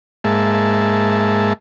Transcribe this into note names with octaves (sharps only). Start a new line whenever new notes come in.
G#2 G#3 A#3 E5 A5